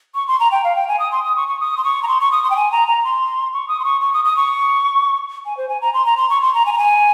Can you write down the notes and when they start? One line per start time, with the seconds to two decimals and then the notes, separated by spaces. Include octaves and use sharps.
0.15 C#6
0.28 C6
0.40 A#5
0.51 G5
0.64 F5
0.75 G5
0.88 G#5
0.99 D#6
1.12 C6
1.24 D#6
1.36 C#6
1.48 C#6
1.60 D#6
1.77 C6
1.84 C#6
2.03 A#5
2.08 C6
2.21 C#6
2.32 D#6
2.44 C6
2.50 G5
2.56 G#5
2.72 A#5
2.88 A#5
3.04 C6
3.53 C#6
3.68 D#6
3.80 C6
3.85 C#6
4.01 C#6
4.13 D#6
4.25 D#6
4.36 C#6
5.46 G#5
5.57 C5
5.69 G#5
5.81 A#5
5.94 C6
6.06 A#5
6.17 C6
6.30 C#6
6.42 C6
6.54 A#5
6.66 G#5
6.73 A#5
6.78 G#5